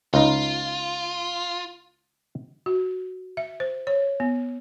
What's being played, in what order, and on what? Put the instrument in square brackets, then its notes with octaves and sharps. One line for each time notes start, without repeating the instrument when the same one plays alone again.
[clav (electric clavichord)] C#2 D#4 [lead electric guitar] F4
[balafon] F#4
E5
C5
C#5
B3